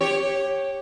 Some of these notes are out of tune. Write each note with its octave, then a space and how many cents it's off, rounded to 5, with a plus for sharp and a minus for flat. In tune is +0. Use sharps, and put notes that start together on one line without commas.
G4 +0 C#5 -15